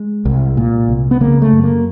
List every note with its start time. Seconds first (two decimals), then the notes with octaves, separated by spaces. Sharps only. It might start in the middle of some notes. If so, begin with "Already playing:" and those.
Already playing: G#3
0.25 C2
0.57 A#2
0.89 C2
1.11 B3
1.21 C#3 A#3
1.42 A3
1.53 F#2
1.63 A#3